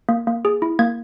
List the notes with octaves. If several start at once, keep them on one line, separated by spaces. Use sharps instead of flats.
A#3
A#3
G#4
E4
A#3 G#6